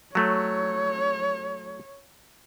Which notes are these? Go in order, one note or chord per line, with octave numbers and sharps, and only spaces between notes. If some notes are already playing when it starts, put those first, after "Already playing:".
F#3 A3 C#5